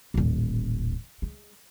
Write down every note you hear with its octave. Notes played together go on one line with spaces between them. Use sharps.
D#1 A1
G#3